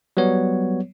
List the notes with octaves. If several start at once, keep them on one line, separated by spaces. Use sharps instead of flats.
F#3 G3 B3 C#5